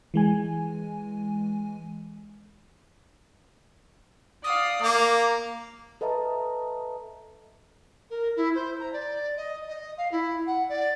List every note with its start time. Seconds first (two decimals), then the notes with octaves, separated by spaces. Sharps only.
0.14 E3 G#3 G#5
4.44 D5 F5 D#6
4.82 A#3 A#5 D6
6.01 A4 B4 D#5 E5 A5 A#5
8.10 A#4
8.36 E4
8.55 C5
8.80 A#5
8.93 D5
9.37 D#5
9.68 D#5
9.97 F5
10.12 E4
10.47 F#5
10.69 D5